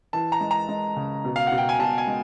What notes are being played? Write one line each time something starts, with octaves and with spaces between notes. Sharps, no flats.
E3 A5
A#5
G#3
A#5
G#3
C#3
B2
F5
B2 F#5
G5
G#5
B2 A5
G#5
G#3